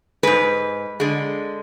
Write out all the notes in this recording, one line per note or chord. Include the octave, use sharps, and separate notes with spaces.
G#2 G#3 B4
D3 G#3